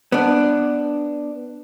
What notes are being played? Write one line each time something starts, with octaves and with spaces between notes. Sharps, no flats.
B3 D4